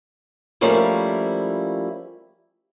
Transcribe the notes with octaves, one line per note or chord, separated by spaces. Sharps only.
F3 G3 A3 A#3 C#4 E4